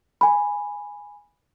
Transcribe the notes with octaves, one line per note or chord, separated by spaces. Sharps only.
G#5 B5